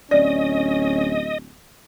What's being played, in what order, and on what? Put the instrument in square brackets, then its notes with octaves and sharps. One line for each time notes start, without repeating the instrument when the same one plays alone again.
[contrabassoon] D1 [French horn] C#4 [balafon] D5 [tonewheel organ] D#5